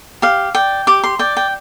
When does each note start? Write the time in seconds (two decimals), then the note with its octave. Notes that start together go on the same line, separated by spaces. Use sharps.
0.22 G4 F5
0.55 D5 G5
0.87 G4 D6
1.04 C6
1.19 D5 G5
1.37 G5